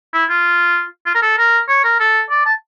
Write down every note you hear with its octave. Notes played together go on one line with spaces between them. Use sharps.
E4
F4
F4
A#4
A4
A#4
C#5
A#4
A4
D5
A5